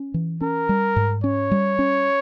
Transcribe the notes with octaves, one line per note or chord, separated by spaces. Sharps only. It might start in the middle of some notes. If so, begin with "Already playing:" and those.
Already playing: C#4
E3
C#4 A#4
G3
G#2
C#4 C#5
G3
C#4